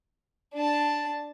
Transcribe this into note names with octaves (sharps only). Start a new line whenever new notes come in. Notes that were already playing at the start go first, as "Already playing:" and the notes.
D4 A5